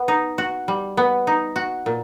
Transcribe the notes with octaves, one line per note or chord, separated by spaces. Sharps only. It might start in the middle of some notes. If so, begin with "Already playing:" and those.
Already playing: B3
D#4
F#4
G3
B3
D#4
F#4
A#2